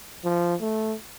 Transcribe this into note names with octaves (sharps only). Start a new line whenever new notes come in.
F3
A3